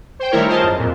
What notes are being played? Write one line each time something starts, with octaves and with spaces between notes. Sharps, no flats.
C5 G5
D#3 G3 A3 E4 A#4 C#5
F4 G#4 A#4 C5 D#5 A5
F#2
F2 A#2